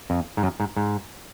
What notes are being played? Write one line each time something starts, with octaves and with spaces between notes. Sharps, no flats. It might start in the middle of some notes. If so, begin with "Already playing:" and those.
F2
G#2
F#2
G#2
G#2